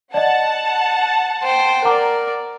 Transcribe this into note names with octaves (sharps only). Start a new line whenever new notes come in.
D5 D#5 F#5 A5
C5 G5
A#4 D5 F#5 A#5 D6